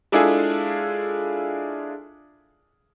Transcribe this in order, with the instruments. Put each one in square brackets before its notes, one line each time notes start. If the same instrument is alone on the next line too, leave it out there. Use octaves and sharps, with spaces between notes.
[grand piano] G#3 D4 E4 F4 G#4 A4